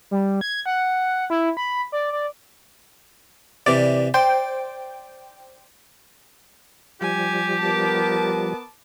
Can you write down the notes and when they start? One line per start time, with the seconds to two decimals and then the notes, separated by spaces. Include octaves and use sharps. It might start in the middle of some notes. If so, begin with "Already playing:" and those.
0.11 G3
0.41 G#6
0.66 F#5
1.30 E4
1.57 B5
1.92 D5
2.12 D5
3.66 C3 E3 D5
4.14 C5 D5 G5
7.01 F3 G3 G4 G#5
7.60 B3 A#4 A5 D6